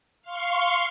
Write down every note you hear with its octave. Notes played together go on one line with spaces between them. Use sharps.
F5 C6 C#6